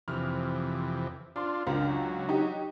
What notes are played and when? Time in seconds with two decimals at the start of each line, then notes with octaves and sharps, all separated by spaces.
0.08 F2 C3 E3 F6
1.36 D4 F4 C6
1.67 C#2 F#2 D4 A#4
1.89 F#3
2.29 D#4 G4